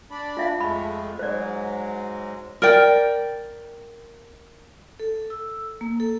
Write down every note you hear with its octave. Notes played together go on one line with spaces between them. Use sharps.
D4 D5 B5
F4 E5 F5
F2 G#3 A3 B5
G#2 F#3 G#3 C5 D5
A#4 D5 G5
A4
E6
A#3
A4